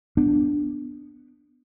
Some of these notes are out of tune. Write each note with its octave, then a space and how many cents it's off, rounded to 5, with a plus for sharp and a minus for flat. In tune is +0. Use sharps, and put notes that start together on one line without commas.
B3 +0 D4 +0